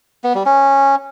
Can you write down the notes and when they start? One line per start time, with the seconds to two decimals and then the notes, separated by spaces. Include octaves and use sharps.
0.24 B3
0.35 G3
0.46 C#4